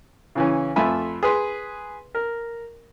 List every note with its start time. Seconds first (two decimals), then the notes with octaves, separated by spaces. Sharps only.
0.35 C#3 E3 C#4
0.76 F2 A3 F4 E5 G#5 B5
1.23 G#4 B4 C6
2.15 A#4